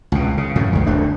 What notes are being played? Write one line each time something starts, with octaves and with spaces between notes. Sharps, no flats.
C#2 B2
C#3
F#2 A2 C#3
C#2 D#3
D1 D2 A3 D4